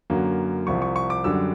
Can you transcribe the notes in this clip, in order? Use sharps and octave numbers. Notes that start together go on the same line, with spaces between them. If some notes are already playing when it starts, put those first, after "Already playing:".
F#2 D3 F#3 A#3
C2 C3 F3 C#6
C#6
C#6
D6
F#2 D3 G3 E6